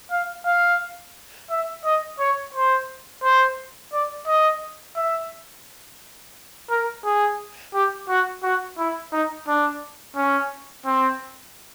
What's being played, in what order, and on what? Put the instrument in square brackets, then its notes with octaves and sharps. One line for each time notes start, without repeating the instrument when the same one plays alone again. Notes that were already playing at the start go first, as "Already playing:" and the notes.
[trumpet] F5
F5
E5
D#5
C#5
C5
C5
D5
D#5
E5
A#4
G#4
G4
F#4
F#4
E4
D#4
D4
C#4
C4